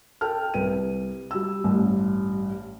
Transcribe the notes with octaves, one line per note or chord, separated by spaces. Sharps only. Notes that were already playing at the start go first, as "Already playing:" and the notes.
A4 G5 A5 F6
C2 B4 D#7
G3 E6
A1 G2